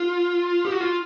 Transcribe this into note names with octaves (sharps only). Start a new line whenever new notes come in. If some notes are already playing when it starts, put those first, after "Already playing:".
Already playing: F4
G4
F#4
F4